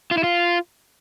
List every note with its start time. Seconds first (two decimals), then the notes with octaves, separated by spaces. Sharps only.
0.11 F4
0.17 E4
0.24 F4